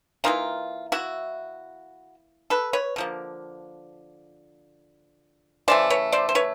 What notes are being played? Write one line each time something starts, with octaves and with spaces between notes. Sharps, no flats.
E3 G3 A#3 D#4 F4
E4 F#4
A4 B4
B4 C#5
D3 F3 A#3
C#3 E3 A3 C5 D5
B4 C#5
C5 D5
C5
B4 C#5